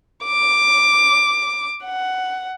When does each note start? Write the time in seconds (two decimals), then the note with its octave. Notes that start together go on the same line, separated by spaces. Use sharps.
0.25 D6
1.85 F#5